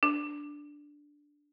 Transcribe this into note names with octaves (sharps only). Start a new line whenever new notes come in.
D4